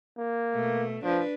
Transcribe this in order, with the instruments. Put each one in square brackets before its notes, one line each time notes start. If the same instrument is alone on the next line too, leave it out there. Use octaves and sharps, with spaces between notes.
[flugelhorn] A#3
[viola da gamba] B2 A3
[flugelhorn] F3 [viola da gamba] D4 B4